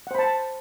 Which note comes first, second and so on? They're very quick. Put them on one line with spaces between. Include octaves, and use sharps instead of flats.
F#5 C5 B5 A5